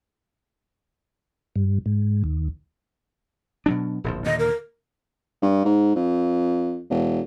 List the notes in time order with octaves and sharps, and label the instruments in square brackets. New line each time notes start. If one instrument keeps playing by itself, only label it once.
[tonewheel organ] G2
G#2
D#2
[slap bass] B2 F#3 D4
D1 A#1 F3
[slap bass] D#2 A#2 D3 [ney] D#5
[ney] A#4
[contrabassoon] G2
G#2
F2
E1